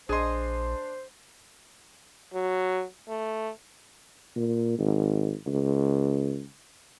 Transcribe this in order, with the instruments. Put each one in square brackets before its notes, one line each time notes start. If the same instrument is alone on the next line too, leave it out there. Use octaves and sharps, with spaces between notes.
[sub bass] A#1 [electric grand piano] D4 C6 [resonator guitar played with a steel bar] G#4 D#5 [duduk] C5
[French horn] F#3
A3
[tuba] A#2
G#1
C#2